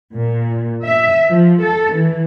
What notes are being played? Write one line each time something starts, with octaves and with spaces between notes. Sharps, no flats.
A#2
E5
F3
A4
E3